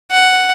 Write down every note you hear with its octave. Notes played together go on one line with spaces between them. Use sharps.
F#5